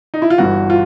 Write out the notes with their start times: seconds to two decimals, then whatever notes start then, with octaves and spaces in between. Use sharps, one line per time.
0.14 D#4
0.22 E4
0.30 F4
0.38 G1 G2 E3 F#4
0.70 F4